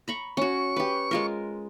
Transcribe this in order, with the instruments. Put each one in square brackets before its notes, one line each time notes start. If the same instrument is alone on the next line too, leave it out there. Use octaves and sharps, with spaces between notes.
[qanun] A#5 B5 C#6
[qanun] C#4 F#4 [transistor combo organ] C#6
[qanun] G4 B4
G#3 F4 A#4